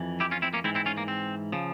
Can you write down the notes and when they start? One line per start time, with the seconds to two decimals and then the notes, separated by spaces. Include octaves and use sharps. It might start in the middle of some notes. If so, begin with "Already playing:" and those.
Already playing: F2 E3
0.20 E4 G4
0.31 C#4 F4
0.42 C4 E4
0.54 A#3 C#4
0.64 G#2 E3 C4 E4
0.75 C4 E4
0.86 C#4 F4
0.97 A#3
1.08 C4
1.52 C#3 F3